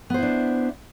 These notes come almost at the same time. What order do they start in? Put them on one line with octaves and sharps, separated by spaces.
B3 C5 E4 D4